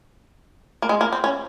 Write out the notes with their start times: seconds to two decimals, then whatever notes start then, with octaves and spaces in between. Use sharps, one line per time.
0.82 A#3
0.89 G#3
1.01 A#3
1.13 C4
1.24 C#4